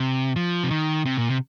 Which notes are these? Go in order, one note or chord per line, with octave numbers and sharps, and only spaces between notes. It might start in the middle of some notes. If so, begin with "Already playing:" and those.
Already playing: C3
F3
C3
D#3
C3
A#2
C3